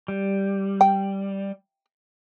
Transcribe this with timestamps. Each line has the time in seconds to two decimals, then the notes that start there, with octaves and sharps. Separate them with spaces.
0.08 G3
0.81 G5